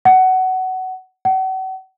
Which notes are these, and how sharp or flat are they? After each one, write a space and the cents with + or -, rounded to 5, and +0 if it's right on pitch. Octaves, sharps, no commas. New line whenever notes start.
F#5 +20
F#5 +40